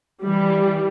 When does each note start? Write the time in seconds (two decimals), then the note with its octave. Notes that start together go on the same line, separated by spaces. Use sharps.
0.23 E3 G3